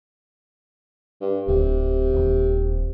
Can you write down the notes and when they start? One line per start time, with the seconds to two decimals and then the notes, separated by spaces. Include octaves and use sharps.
1.21 G2
1.48 D1 C3
2.13 D#1